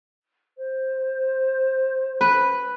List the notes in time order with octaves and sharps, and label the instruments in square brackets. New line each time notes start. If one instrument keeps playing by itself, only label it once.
[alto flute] C5
[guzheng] B4